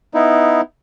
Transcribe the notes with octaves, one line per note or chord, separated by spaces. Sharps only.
B3 D#4 E4